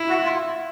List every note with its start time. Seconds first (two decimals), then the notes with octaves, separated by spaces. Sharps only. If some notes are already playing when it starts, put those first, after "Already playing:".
Already playing: E4
0.09 F#4
0.24 F4